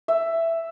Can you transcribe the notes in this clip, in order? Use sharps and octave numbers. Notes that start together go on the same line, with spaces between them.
E5